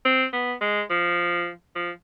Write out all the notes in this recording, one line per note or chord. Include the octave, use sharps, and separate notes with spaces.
C4
B3
G#3
F3
F3